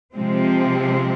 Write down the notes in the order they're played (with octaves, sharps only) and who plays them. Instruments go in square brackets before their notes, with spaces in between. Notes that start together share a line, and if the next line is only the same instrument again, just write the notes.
[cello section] C3 F3 G#3 C4